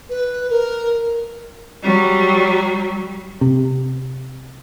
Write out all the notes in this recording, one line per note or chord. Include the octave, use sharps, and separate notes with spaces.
B4
A#4
F#3 G3
C3